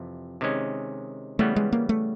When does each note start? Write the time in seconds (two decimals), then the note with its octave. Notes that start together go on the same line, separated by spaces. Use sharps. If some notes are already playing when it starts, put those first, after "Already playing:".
Already playing: F2 C3 E3
0.41 C3 D#3 G#3 C#4
1.39 C#3 E3 G3 A3 B3
1.56 G#3
1.73 A#3
1.89 A3